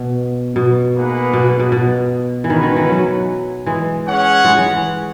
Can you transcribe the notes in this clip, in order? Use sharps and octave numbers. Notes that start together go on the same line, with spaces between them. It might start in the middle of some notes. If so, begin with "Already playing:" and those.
Already playing: B2
B2
A#3 D#4 G#4 B4 F#5
B2
B2
B2
E3
D#3 G#3 C#4 F#4 B4
D#3
E3
F#3
E3 G#3
C#4 G#4 C#5 F#5
E3 G#3
E3 G#3
E3